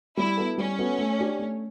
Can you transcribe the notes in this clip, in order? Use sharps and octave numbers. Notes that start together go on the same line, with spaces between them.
G3 E4
B3 F#4 A4
G3 C#4
B3 F#4 A4
A3
D4 G4
A3